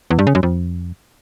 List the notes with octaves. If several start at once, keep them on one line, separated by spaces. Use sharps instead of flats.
E2
G2
C#3
F#2
F2